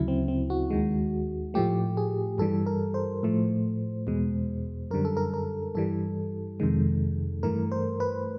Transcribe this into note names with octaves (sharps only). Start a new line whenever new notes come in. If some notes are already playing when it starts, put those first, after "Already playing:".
Already playing: D2 C#3 F#3 E4
C4
C4
F#4
D#2 D#3 G#3
A2 F3 A3 G4
G#4
G2 E3 G3 A4
A#4
C5
A2 F3 A3
E2 B2 G#3
F#2 D3 G3 A#4
A4
A#4
A#4
G2 E3 G3 A4
F2 C3 D#3 G#3
G2 E3 A3 A#4
C5
B4